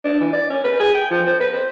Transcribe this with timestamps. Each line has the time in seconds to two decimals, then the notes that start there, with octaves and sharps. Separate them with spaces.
0.04 D4
0.20 E3
0.33 D5
0.50 C#4
0.64 B4
0.80 G#4
0.94 G5
1.11 F3
1.26 C5
1.40 B4
1.53 C5